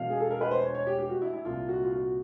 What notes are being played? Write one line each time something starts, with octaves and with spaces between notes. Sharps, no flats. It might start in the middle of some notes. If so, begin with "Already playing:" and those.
Already playing: E1 E2 B2 F5
G#4
A4
A#4
B4
C5
C#5
C#5
G4
G4
F#4
E4
E4
C2 A#2 F4
F#4
F4
F#4